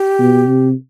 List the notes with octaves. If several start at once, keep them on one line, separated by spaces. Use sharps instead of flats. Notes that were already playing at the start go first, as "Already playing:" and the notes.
Already playing: G4
B2
C3